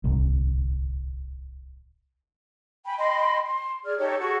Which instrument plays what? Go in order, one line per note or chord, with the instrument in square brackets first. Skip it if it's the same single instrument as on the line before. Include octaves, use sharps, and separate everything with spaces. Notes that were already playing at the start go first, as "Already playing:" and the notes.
[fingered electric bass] D1 C2
[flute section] G5 G#5 B5
D#5 G5 B5 C6
C6
G#4 D5 F6
D#4 G4 A4 C#5
F#4 G#4 A4 C#6